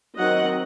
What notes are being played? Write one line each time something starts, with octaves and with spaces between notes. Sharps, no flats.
D#3 F#3 C4 D#5 F#5